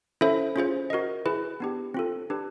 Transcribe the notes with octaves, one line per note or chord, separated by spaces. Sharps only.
C#4 E4 A4 C5 E5
C#4 F4 G#4 C5
F#4 A#4 D#5
E4 G#4 B4
B3 D4 G4
C4 F4 A4
D4 G4 B4